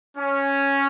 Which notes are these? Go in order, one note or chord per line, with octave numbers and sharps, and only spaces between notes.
C#4